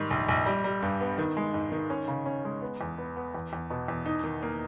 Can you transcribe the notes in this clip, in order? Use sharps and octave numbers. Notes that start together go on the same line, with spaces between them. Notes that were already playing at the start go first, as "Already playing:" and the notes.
Already playing: G#2 D#3 G3
A#1
A#1
G3
G3
G2
B3
D#3
G#3
G#2
D#3
C#4
C#3
C#4
G#3
B3
E2
B3
B3
E2
E2
B2
E2
D#4
D#3
A#3